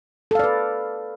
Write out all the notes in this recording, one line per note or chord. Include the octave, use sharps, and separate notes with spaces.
A4 B4 D5 F5